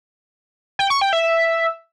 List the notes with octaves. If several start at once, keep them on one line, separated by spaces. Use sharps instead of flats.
G5
C#6
G5
E5